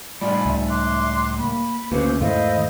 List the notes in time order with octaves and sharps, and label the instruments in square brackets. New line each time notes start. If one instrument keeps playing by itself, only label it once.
[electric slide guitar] A2 G3 D5 [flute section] F4 G#5 B5
[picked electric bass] C#2 [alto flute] E5
[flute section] C6 D6 F#6
[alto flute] A#3 [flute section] B5
[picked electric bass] D2 C#3 [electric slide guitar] A3 A#3 F#4 [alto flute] B4 [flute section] C5 D6
[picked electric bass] E2 G#2 A3 [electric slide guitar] D#3 [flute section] E4 C5 D#5 [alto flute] F5